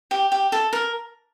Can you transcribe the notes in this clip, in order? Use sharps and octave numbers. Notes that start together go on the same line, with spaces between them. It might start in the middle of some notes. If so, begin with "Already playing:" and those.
G4
G4
A4
A#4